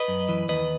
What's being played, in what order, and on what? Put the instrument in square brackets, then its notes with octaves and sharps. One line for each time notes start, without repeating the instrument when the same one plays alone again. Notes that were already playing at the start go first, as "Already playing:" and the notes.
Already playing: [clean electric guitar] B4 D#5
F#2
E3
D#2 B4 D#5